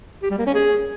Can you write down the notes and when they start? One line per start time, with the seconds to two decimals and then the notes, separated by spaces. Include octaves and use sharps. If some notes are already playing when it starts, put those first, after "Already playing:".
0.23 G4
0.31 G3
0.38 A#3
0.46 C#4
0.54 G#4